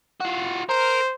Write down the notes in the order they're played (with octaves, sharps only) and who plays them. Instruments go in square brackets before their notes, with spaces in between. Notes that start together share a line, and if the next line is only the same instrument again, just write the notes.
[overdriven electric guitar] F4 F#4
[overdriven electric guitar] A#4 [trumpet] C5